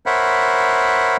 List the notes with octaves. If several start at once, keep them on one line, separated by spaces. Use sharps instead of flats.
A#4 C5 C#5 E5 F#5 B5